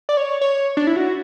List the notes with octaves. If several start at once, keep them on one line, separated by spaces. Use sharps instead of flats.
D5
C#5
C#5
D4
E4
F#4